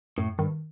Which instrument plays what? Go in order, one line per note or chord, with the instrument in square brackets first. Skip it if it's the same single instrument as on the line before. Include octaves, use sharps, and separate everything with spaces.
[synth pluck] F#2 [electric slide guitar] A2
[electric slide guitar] G2 [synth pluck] D#3